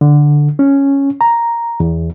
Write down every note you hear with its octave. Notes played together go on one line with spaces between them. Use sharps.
D3
C#4
A#5
E2